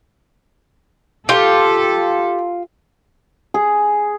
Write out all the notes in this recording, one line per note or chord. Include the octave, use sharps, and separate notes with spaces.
F4 G4 A4
G#4